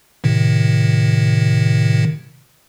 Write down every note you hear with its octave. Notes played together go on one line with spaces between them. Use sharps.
A2 C3 D#3